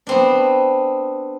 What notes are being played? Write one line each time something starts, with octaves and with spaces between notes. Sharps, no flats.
B3 C4 D4